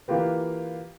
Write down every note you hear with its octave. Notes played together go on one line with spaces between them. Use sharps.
E3 A#3 F4 G4 B4